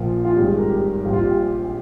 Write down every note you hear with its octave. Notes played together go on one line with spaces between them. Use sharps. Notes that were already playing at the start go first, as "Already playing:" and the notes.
Already playing: A#1 A#2 F3 A#3 F4
F4
G#1 G2 D#3 G#3 G4
G#4
A#4
G4
A#1 A#2 G3 C4 G4
F4
G4